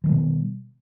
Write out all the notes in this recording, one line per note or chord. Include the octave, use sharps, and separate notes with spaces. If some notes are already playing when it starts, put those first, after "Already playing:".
B2 D#3 E3 G3